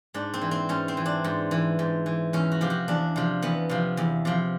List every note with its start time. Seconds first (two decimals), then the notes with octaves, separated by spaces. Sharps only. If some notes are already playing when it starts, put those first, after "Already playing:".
0.14 G#2 D4
0.34 C4
0.41 E3
0.51 C4
0.69 G#2 C#4
0.88 C4
0.97 E3
1.06 D4
1.24 G#2
1.51 E3
1.79 G#2
2.06 E3
2.33 E2 C#4
2.52 F#4
2.61 C3 F3 G4
2.70 F#4
2.88 E2 D4
3.16 C3 F3
3.42 E2 B3
3.69 C3 F3
3.97 E2
4.25 C3 F3